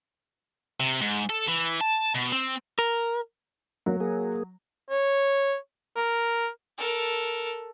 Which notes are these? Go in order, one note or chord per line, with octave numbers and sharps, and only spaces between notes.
C3
G#2
A4
E3
A5
B2
C4
A#4
F#3 A#3
A#3 G#4
C#5
A#4
A4 A#4